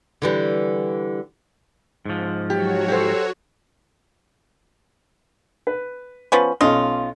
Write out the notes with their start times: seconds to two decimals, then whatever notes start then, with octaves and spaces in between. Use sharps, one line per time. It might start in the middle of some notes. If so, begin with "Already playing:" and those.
0.22 D3 E3 G3
2.06 G#2 F3
2.50 F#3 F#4 G4 C#5
2.88 G4 A4 C5
5.67 B4
6.32 F3 B3 C#4
6.61 B1 C#4 F4 D#5